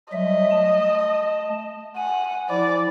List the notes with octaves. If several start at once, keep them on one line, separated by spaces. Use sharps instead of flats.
F#3 G3 D#5 E5
A3 A5
F#5 G#5
F3 E4 D5